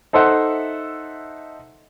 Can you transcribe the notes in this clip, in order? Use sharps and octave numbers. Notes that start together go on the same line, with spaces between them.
D#4 A4 C5 E5 F#5